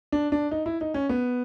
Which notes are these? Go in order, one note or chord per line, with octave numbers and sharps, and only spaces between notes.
D4
D4
D#4
E4
D#4
C#4
B3